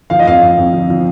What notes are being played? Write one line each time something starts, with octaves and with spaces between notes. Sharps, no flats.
F3 F5
D#5
F2 F5
F2
F2
F3
F3